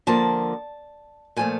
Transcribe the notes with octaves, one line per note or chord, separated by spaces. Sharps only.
D3 F3 A#3 A5
A#2 F3 A3 G#5